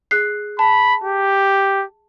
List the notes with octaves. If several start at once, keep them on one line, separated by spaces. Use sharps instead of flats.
G#4 F#6 C7
A5 B5
G4